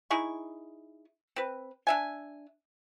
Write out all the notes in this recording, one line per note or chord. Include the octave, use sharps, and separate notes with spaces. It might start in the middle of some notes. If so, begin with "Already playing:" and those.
D#4 E4 G#4 C#6
C4 B4
D4 E5 G#5